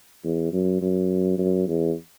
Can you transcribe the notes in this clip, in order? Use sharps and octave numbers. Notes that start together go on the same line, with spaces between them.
E2
F#2
F#2
F#2
E2